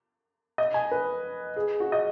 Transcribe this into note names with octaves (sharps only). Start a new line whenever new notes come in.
D#5
G#5
B4
G#4
F#4
D#5